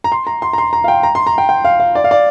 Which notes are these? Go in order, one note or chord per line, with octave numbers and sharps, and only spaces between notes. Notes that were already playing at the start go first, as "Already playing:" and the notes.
A#5
C6
A#5
C6
A#5
C6
A#5
F5
G5
A#5
C6
A#5
G5
G5
F5
F5
D5
F5
D5